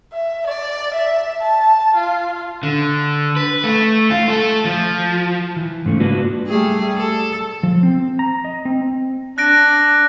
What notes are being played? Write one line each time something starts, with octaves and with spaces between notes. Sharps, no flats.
E5
D5
E5
A5
F4
D3
B4
A3
F4
A3 A4
F3
E3
G#2 C#3 A3
A#3 D4 F4 F#4 B4
G3 A3 G#4
A4
F3
C4
A#5
D#5
C4
D4 F#6 A#6 D7